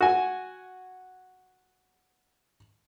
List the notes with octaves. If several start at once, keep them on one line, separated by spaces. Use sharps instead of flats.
F#4 G#5